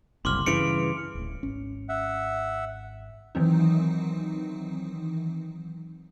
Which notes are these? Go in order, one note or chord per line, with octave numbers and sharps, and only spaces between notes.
F#1 C2 C6 D6 F6
G2 C#3 E3 C#7 D7 F7
D1 A2
G#1 C#4
E5 F#5
D#3 E3 F#3 C4 D#4